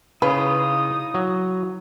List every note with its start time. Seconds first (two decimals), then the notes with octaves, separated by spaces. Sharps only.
0.22 C#3 D#4 E4 B4 F5 D#6
1.14 F#3